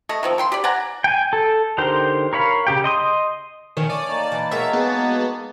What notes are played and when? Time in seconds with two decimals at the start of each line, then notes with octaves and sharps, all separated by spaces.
0.09 A3 D#5
0.23 D#3 F3 C4
0.38 D#3 G5 C6
0.52 G4 D5
0.64 D5 F#5 G#5 A#5
1.04 G5 G#5
1.33 A4
1.78 D3 D#4 G4 A#4 C5
2.33 A#4 C#5 F5 B5
2.67 C#3 G4 G5
2.84 D#5 C6 D#6
3.77 D#3 A3 C#4 C#5 G#5
3.90 D5 D#6
4.09 A#3 D#4 A5
4.32 E3
4.51 G#3 F#4 A#4 C#5 E5
4.73 B3 G#4